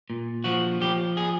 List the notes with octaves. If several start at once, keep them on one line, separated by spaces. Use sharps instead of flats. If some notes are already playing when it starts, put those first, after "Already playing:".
A#2
F3 F#4
F3 G4
G#4